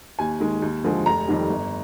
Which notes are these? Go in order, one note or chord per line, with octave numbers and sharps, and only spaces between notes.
D#2 G#5
D#3 G#3
D#2
D3 F3 G#3
F1 A#5
F2 D#3 G3
G1